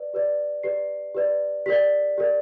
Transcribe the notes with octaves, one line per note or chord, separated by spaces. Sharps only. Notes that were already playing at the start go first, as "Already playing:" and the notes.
Already playing: B4 D5
G4 B4 D5
G4 B4 D5 C7
G4 B4 D5
G4 A#4 D5 B6
G4 A#4 D5